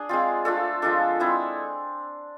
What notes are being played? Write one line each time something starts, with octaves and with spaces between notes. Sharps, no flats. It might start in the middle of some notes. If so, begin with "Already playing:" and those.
Already playing: D4 G#4
G#3 C4 F4
A3 D4 F4 A4
F3 G#3 D4 A4
G#3 C4 E4